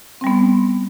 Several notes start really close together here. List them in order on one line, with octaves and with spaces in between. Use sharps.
C4 G3 B3